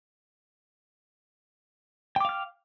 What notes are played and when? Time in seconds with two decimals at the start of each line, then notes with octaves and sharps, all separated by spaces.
2.16 G5
2.20 D6
2.25 F5
2.29 F6